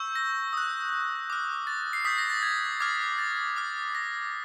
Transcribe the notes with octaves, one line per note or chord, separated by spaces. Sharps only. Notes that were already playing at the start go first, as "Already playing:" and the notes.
Already playing: C#6 E6 G6
A#6
D#6 F#6
D6 F6
A6
C7
D#6 G6 B6
A#6
A6
G#6
D6 F6 G#6
A6
D6 F6
A#6